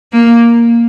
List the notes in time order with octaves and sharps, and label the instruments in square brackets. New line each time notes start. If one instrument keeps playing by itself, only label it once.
[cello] A#3